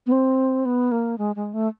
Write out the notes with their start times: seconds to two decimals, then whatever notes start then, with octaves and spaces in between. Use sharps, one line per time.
0.07 B3
0.12 C4
0.65 B3
0.92 A#3
1.18 G#3
1.36 G#3
1.54 A3